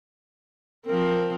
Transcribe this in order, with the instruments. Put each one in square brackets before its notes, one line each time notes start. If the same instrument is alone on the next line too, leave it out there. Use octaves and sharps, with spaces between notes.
[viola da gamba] F3 C4 [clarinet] A#4